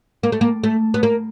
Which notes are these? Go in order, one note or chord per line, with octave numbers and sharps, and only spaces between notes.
A#3
A3
A#3
A3
B3
A#3